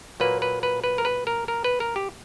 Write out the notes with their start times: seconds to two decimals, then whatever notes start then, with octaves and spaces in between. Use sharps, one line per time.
0.20 A#2 F#3 A#3 B4
0.42 B4
0.63 B4
0.84 B4
0.98 A#4
1.05 B4
1.27 A#4
1.48 A#4
1.64 B4
1.80 A#4
1.96 G4